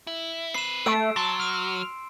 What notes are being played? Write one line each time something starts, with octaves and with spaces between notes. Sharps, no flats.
E4
C4 B4 C7 E7
A3 E6 D7
F#3 A5 C6
F6